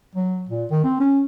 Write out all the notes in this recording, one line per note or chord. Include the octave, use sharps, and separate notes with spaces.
F#3
A#2
D#3
C4
C#4